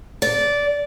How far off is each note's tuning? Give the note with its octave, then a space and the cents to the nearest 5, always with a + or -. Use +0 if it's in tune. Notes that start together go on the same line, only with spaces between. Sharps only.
D5 -15